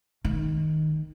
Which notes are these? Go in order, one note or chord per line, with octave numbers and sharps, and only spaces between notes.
D#3